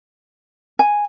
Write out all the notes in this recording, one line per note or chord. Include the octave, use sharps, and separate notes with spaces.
G#5